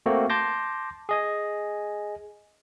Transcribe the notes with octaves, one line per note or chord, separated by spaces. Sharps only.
A3 A#3 C4 F#4
A5 C6 D6 G6 A#6
G#4 D#5 G#5